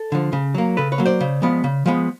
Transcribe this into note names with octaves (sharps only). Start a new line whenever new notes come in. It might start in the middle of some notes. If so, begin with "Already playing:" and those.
Already playing: A4
D3 F3
C#3
F#3 A#3
C#3 A4 B4
B4 C#5
F#3 A#3
C5 D5
C#3
F3 G#3 B3
C#3
F3 G#3 B3